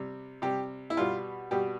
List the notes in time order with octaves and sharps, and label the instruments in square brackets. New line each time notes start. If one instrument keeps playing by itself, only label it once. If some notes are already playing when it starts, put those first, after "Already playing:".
Already playing: [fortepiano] C3 G3
C3 G3 G4
E4
B2 G3 F4
B2 G3 G4